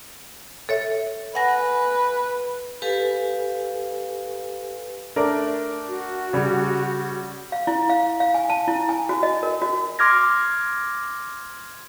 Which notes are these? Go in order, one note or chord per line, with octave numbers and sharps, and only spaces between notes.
A4 C#5 E5
B4 F#5 G#5 A#6
G4 A4 B4 F5 G#5
A3 D4 A#4
F#4
C#3 G3
F5
E4
F5
F5
G#5
A5
E4
G#5
F#4
D#5
A#4
F#4
C6 D6 F6 G#6 A#6